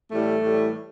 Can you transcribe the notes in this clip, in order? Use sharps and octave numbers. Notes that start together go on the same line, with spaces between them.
A2 E3 G3 A3
A2 E3 G3